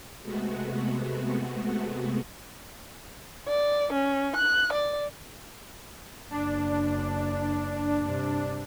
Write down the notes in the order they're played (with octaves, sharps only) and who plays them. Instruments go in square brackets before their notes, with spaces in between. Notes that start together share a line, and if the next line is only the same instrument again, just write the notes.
[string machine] C3 G#3 A3 B3 F#4
[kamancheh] D5
C#4
F#6
D5
[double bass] F#1 [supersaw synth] D4
[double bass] G2 C3